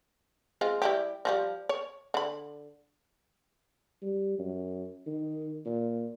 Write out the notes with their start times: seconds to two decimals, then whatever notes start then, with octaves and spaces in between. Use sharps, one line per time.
0.61 G#3 C4 F4
0.82 G3 E4 G4
1.25 E3 F3 G3
1.69 C#5
2.14 D3 B5
4.02 G3
4.39 F#2
5.06 D#3
5.66 A#2